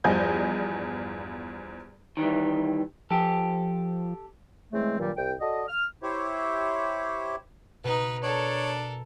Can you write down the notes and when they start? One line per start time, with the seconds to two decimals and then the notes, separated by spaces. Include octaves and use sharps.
0.04 E2 G2 F3 D#5 G#5 G6
2.17 D#3 E3 G3
3.11 F3 G4 A4
4.73 C#3 E3 G#3 A3 C4
4.99 G2 A#2 D#3 F#3 G3
5.17 C2 G5
5.40 F#4 A4 D5 D#5
5.68 F6
6.03 E4 G4 C5 C#5 E5
7.84 B2 D#4 B4
8.23 D4 A4 A#4 C#5